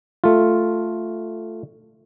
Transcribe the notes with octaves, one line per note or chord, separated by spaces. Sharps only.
A3 F4